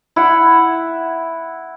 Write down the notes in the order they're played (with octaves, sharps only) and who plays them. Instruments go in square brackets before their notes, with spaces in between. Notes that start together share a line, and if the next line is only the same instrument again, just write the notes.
[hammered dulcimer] E4 F#5